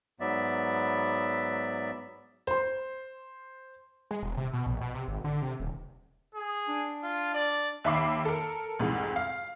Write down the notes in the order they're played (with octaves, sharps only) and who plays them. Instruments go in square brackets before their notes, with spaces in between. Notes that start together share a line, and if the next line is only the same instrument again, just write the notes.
[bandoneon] G#2 F#3 B3 D5 E5
[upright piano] C5 C6
[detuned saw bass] G#3
E1
C3
B2
A#1
B2
C3
G#1
D3
C3
D#1
[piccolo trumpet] G#4
[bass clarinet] D4
[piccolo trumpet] F4
D5
[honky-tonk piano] D#2 E5 B5 D6 C7
A4 A#4
C2 F2 G#2 E3
F5